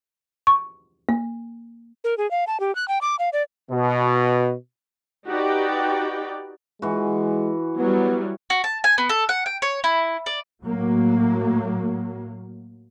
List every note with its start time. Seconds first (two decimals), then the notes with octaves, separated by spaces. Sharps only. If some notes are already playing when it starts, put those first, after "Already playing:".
0.47 C#6
1.09 A#3
2.04 A#4
2.18 G#4
2.31 F5
2.47 A5
2.60 G4
2.75 F#6
2.88 G5
3.01 D6
3.19 F5
3.33 D5
3.71 B2
5.27 D#4 F#4 G4 B4 D5 G5
6.82 E3 G#3 F#4
7.78 F#3 G3 B3
8.50 F#4
8.64 A5
8.84 G#5
8.98 B3
9.09 A4
9.29 F#5
9.46 G5
9.62 C#5
9.84 E4
10.26 D5
10.62 A2 F#3 A#3